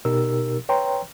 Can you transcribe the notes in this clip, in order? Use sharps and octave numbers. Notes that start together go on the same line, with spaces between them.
B2 D#4 G4 A#4 E6
B4 C#5 G5 A#5 C6